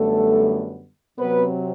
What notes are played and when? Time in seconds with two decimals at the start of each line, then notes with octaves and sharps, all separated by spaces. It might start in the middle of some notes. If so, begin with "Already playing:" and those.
Already playing: F#2 D3 G3 A3 B3 A4
1.19 C3 F#3 B3 C4 B4